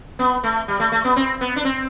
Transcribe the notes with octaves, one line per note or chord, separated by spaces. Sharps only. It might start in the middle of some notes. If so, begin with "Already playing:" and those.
B3
A3
G3
A3
A3
B3
C4
B3
D4
C4